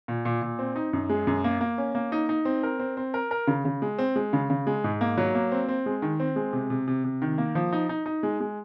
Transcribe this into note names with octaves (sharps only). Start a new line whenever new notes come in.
A#2
A#2
A#2
C4
D#4
F#2
G#3
F#2
A#3
A#3
C#4
A#3
D#4
D#4
C4
A#4
C4
C4
A#4
A#4
C#3
C#3
G#3
C4
G#3
C#3
C#3
G#3
G#2
A#3
F#3
A#3
C4
C4
G#3
D#3
C4
G#3
C3
C3
C3
C3
D#3
A#3
F3
D#4
D#4
D#4
G#3
G#3